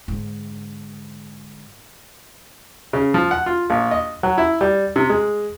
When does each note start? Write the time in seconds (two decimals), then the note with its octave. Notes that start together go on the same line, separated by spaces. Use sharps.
0.08 G#2 D3
2.93 C#3
3.14 F3
3.31 F#5
3.46 F4
3.70 A#1
3.91 D#5
4.23 F#3
4.38 E4
4.61 G3
4.96 C3
5.09 G#3